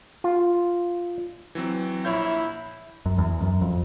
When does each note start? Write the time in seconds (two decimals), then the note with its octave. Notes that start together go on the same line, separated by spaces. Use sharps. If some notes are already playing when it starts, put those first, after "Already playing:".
0.24 F4
1.55 E3 F#3 C4
2.05 A#1 E4 C#5 G6
3.06 F#2
3.18 E2
3.42 F#2
3.61 F2